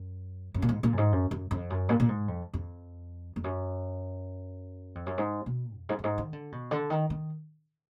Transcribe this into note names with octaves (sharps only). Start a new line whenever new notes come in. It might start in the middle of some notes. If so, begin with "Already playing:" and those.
Already playing: F#2
F#2
A#2
G#2
A#2
F#2
G#2
F#2
F#2
F2
F#2
A#2
A#2
G#2
F2
F2
F2
F#2
F2
F#2
G#2
B2
F2
G#2
F#2
G#2
D#3
D3
B2
D3
D#3
D#3